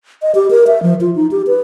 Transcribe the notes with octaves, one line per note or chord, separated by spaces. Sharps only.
D#5
G4
A#4
E5
F3
F4
D#4
G4
B4